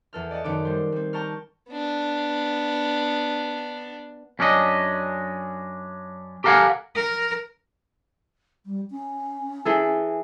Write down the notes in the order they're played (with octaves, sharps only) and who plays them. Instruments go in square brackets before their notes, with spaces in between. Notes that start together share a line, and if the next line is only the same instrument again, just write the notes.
[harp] E2 A4 F6
D5 D#5 F#5 A5
F#2 D#3 B3 D#4 D5 D6
G3 C5
G3 C4
G5 A5 A#5 C#6 F6
[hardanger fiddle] B3 D4
[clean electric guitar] F#2 C#4 D4 E4 D#5
G4 A4 A#4 F5 F#5 G#5
[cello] A#4
[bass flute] G3
C#4
[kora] E3 G#4 A4